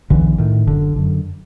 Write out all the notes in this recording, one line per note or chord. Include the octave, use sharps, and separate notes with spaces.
B1 D3 E3
A2 D#3
F#1 D3
F#2 D3